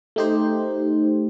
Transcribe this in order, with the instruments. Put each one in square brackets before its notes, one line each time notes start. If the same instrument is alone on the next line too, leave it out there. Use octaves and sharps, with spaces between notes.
[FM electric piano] A3 D#4 G4 C5